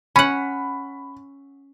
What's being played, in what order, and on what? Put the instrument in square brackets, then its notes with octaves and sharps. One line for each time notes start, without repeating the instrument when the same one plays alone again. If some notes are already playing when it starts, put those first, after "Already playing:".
[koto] C#4 F#5 [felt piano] B5